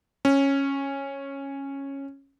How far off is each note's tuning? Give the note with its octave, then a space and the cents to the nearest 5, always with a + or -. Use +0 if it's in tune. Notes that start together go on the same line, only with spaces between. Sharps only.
C#4 -10